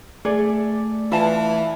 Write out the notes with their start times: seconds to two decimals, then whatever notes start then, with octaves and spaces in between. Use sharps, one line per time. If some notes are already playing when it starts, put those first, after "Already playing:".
0.25 A3 G#4 D5
1.12 E3 F4 B4 A5